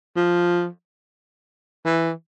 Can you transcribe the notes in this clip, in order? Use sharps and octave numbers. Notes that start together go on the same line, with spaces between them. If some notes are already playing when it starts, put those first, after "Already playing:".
F3
E3